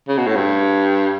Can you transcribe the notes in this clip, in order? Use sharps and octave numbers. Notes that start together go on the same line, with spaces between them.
C#3
B2
A2
G2